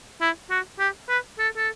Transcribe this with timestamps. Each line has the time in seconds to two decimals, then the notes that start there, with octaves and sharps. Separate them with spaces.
0.21 E4
0.50 F#4
0.79 G4
1.09 B4
1.39 A4
1.57 A4